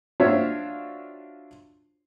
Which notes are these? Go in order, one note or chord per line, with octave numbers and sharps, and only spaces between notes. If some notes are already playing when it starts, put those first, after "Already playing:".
D4 F4 F#4 C5 C#5 E5